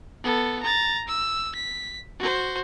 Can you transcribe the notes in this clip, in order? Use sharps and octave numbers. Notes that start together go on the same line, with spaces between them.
B3 A4
A#5 A6
E6
B6
F#4 C5